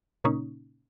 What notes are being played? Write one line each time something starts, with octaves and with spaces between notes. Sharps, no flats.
A#2 C#3 A#3 C#4 D#4